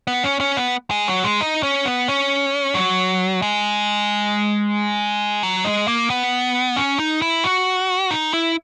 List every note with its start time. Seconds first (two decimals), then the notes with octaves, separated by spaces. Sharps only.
0.07 B3
0.24 C#4
0.40 C#4
0.57 B3
0.91 G#3
1.08 F#3
1.24 G#3
1.41 D#4
1.63 C#4
1.85 B3
2.08 C#4
2.75 F#3
3.42 G#3
5.43 F#3
5.65 G#3
5.88 A#3
6.10 B3
6.76 C#4
6.99 D#4
7.22 E4
7.44 F#4
8.11 D#4
8.34 E4